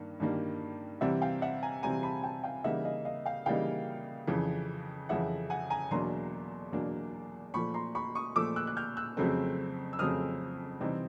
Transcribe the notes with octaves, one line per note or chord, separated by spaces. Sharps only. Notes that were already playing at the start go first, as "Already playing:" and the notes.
Already playing: G2 D#3 A#3
G2 D#3 G3 A#3
C3 E3 G3 C4 E5 F#5
F5 G5
E5 F#5
G#5 A#5
C3 E3 G3 C4 G#5 A#5
A5 B5
G5 A5
F5 G5
C#3 E3 G3 A#3 D#4 E5 F#5
D#5 F5
D#5 F5
F5 G5
C#3 E3 G3 A#3 D#4 F5 G5
F2 C#3 E3
F2 C#3 E3 E5 F#5
F#5 G#5
G#5 A#5
E2 B2 F#3 A#3 D4 A#5 C6
E2 B2 F#3 A#3 D4
A#2 F3 A3 B5 C#6
A#5 C6
B5 C#6
C#6 D#6
A#2 F3 A3 D6 E6
E6 F#6
F#6
F6 G6
E6 F#6
F2 C#3 F#3 A3 C4
E6
F2 C#3 F#3 A3 C4 D#6 F6
C3 E3 G3 C4 D#4